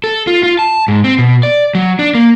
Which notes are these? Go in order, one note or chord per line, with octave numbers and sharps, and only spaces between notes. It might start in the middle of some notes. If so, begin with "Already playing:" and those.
A4
F4
F4
A5
G#2
C4
B2
D5
F#3
D4
A#3